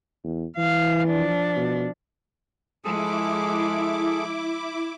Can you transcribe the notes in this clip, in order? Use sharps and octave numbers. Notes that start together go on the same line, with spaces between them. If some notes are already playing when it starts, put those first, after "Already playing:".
E2
E3 F5
F3 D4
B2
F3 G#3 E4 G#4 A4 D6